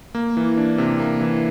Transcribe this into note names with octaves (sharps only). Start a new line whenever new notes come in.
A#3
E3
D4
C3
A#3
E3